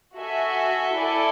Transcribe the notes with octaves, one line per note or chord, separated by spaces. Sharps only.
F#4 A4 E5 G#5
E4 A4 D5 G#5